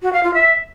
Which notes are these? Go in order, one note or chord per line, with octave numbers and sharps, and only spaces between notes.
F#4
F5
F4
E5